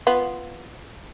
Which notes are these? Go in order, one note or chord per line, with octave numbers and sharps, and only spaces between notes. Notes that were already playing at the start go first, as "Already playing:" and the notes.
B3 F4